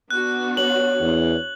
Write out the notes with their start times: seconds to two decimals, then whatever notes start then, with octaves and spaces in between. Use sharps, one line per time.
0.10 B3 D4 F#4 F#6
0.57 C#5 F#7
1.01 E2